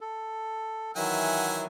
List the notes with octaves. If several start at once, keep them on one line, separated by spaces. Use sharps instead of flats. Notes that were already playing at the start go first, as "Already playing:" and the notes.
A4
D#3 E3 F#3 E5 F#5 G#5